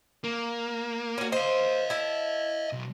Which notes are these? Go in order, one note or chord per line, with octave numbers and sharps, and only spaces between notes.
A#3
C#4 F#4
C5 D#5 F5
E4 A5
B1